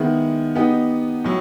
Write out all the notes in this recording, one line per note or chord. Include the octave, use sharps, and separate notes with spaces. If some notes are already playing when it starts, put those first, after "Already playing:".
Already playing: D#3 G#3 B3 E4
B3 D#4 G4
A2 F#3